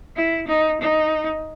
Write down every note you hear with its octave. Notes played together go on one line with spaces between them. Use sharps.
E4
D#4
D#4